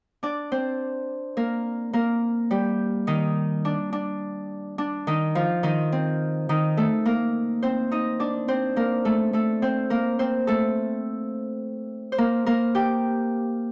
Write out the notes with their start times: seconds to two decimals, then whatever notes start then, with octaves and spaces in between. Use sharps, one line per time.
0.23 D4 D5
0.52 C4 C5
1.37 A#3 A#4
1.93 A#3 A#4
2.51 G3 G4
3.07 D#3 D#4
3.65 D4
3.93 D4
4.78 D4
5.07 D#3 D#4
5.35 F3 F4
5.63 D#3 D#4
5.92 C4
6.49 D#3 D#4
6.77 A3 A4
7.06 A#3 A#4
7.63 C4 C5
7.92 D#4 D#5
8.20 D4 D5
8.48 C4 C5
8.76 A#3 A#4
9.05 A3 A4
9.33 A3 A4
9.62 C4 C5
9.90 A#3 A#4
10.19 C4 C5
10.47 A3 A4
12.12 C5
12.18 A#3 A#4
12.46 A#3 A#4
12.75 G4 G5